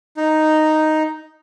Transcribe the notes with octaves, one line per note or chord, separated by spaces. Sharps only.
D#4